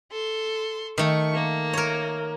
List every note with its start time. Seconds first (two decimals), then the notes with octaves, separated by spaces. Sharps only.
0.11 A4 C6
0.98 D#3 A3 C#6
1.34 A#3
1.73 A#4 C#5